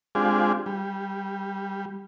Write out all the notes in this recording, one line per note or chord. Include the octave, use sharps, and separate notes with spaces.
G#3 C4 D4 F4 G4 G#4
G3